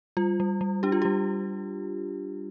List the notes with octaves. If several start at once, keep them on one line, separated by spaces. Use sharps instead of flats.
G3 F4
G3
G3
D4 G4
F4
G3 G4